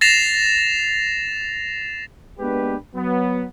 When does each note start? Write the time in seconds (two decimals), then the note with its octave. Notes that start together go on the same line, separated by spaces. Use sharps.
0.01 A6 A#6 C7 E7 F7
2.39 G#3 A#3 B3 D4 G4 B4
2.95 F#3 B3